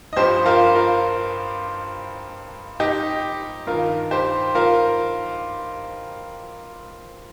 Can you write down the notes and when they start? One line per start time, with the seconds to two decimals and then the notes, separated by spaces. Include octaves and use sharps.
0.13 D#5
0.16 G2 F3 G4 C5
0.46 F4 A#4
0.75 F4 A#4
2.80 D#4 G4
3.67 G2 D#3 F4 A#4
4.11 G4 C5
4.55 F4 A#4